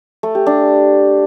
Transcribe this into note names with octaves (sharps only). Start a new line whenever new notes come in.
A3
G4
D4